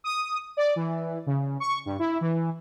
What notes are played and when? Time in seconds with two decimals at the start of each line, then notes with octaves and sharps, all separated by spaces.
0.04 D#6
0.57 D5
0.76 E3
1.26 C#3
1.60 C#6
1.85 G2
1.99 E4
2.21 E3